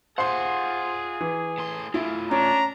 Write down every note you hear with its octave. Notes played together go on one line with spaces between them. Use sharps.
F4 G#4 C5 F#5 C6
E3
A2 C6
A3 E4 F4
C#4 D4 A#5